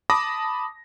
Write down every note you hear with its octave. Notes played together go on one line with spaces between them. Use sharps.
A5 B5 D6 D#6 A#6